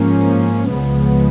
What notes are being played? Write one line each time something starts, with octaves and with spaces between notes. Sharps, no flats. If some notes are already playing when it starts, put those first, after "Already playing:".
Already playing: G#2 F3 A#3 C#4
C#2 C#3 F3 G#3 B3